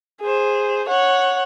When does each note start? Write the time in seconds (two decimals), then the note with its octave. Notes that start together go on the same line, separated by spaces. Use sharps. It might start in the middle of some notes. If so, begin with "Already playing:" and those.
0.21 G#4 C5
0.89 C#5 F#5